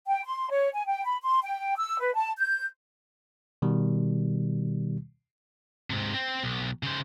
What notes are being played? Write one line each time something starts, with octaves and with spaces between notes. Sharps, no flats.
G5
C6
C#5
G#5
G5
B5
C6
G5
E6
B4
A5
G6
B2 D#3 G3
G#2 C3
C4
B1
C#3 C5